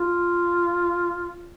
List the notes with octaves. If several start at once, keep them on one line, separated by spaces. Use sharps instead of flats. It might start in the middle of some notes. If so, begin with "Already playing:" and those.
Already playing: F4